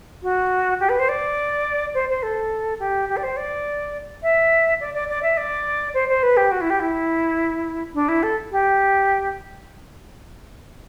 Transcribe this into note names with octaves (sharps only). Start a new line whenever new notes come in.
F#4
G4
B4
C5
D5
C5
C5
A4
G4
G4
D5
C5
D5
E5
D5
D5
D5
E5
D5
C5
C5
B4
G4
F#4
E4
G4
E4
D4
E4
A4
G4